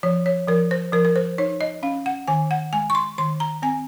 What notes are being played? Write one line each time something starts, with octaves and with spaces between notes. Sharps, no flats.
F3 C#5
C#5
F3 A#4
C5
F3 A#4
A#4
C5
D#4 C#5
D#5
C#4 F5
F#5
D#3 G#5
F#5
G#3 G#5
C#6
C6
D#3 C6
A#5
C4 G#5